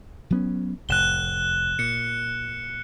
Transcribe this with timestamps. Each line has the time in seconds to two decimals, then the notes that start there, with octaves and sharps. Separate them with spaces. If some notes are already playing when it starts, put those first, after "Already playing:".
0.30 F#3 B3 C#4
0.89 F1 A2 F#6 E7 G7
1.79 A#2 C#7